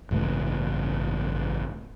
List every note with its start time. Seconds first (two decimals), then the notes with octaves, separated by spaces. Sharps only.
0.11 A1 G2 C#3 A3